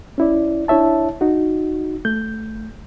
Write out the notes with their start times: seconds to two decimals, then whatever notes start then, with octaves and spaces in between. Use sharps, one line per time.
0.18 C#4 E4 D5
0.68 D4 E4 C#5 E5 A5
1.21 D#4 F#4
2.05 A3 G6